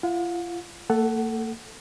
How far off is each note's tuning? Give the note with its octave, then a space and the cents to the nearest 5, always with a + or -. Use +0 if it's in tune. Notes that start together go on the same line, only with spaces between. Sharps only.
F4 -35 F5 +45
A#3 -45 A4 +0 F#5 +15